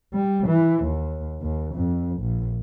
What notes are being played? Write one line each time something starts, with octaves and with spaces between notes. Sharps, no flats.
G3
E3
D#2
D#2
F2
A#1